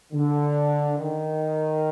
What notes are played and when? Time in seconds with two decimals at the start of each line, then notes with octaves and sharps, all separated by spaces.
0.12 D3
0.97 D#3